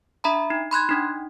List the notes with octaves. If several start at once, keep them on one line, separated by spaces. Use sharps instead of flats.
D4 E5 A#5 B5
D#4
B5 C6 F#6 G#6
D4 D#4